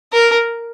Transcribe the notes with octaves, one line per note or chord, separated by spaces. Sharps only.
A#4